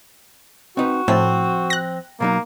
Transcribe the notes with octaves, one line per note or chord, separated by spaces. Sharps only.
C4 D#4 F#4 B4
A2 F3 C4 A5
F#6 A#6
B2 F#3 A#3 D#4